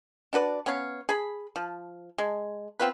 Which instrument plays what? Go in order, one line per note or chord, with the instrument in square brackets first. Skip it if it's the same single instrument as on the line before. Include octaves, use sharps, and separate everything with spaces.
[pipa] D4 F#4 B4 D5
B3 C#4 C#5 F5
G#4 B5
F3
G#3
B3 C4 F4 B4